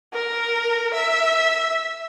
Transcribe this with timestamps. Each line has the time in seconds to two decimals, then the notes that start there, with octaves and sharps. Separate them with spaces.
0.14 A#4
0.94 E5